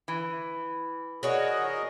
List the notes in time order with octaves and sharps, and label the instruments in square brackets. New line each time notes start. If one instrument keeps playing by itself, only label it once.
[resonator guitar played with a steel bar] E3
[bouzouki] F#4 C#5 [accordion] G#4 A#4 D#5